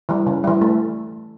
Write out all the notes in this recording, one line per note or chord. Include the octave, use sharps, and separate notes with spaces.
E3 G3
C#3
E3 G3
A3